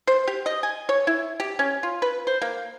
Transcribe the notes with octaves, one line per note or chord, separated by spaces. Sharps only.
C5
G4
D#5
G#5
C#5
E4
G4
C#4
F4
B4
C5
A#3